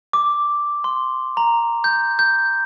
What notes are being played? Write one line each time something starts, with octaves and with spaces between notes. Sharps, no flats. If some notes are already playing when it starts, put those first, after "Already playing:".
D6
C6
A#5
G6
G6